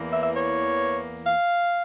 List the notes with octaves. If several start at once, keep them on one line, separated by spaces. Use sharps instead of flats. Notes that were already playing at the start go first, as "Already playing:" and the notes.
Already playing: E2 E3 A#3
E5
E5
C#5
F5